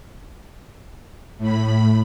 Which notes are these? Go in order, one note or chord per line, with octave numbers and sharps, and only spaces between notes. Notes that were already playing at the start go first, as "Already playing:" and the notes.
A2 B5